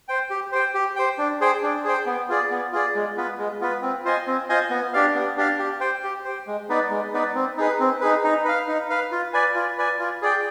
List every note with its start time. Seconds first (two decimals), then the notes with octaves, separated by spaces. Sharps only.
0.08 C5 G5
0.30 G4
0.52 C5 G5
0.74 G4
0.96 C5 G5
1.18 D4
1.41 G#4 C5 G5
1.63 D4
1.84 G#4 C5 G5
2.06 B3
2.29 F4 G#4 D5
2.51 B3
2.72 F4 G#4 D5
2.95 G#3
3.17 B3 F4 B4
3.38 G#3
3.61 B3 F4 B4
3.82 C4
4.05 F4 C5 D#5 G#5
4.27 C4
4.49 F4 C5 D#5 G#5
4.70 B3
4.93 D4 G4 D5 F5
5.15 B3
5.37 D4 G4 D5 F5
5.59 G4
5.80 C5 G5
6.04 G4
6.24 C5 G5
6.47 G#3
6.69 B3 D#4 B4 D5
6.91 G#3
7.14 B3 D#4 B4 D5
7.35 C4
7.58 D#4 G#4 B4
7.80 C4
8.01 D#4 G#4 B4
8.24 D#4
8.45 B4 F5
8.68 D#4
8.90 B4 F5
9.12 F4
9.33 B4 D5 G#5
9.55 F4
9.78 B4 D5 G#5
9.99 F4
10.22 G#4 D5 G5